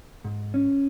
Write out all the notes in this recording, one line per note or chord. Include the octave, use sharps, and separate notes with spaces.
G#2
C#4